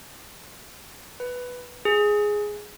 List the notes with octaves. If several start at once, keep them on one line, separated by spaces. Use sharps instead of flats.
B4
G#4